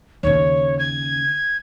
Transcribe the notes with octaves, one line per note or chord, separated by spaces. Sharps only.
D#2 C#3 C#5
G#6